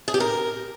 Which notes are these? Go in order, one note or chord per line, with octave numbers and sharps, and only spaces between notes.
G#4
G4
A#4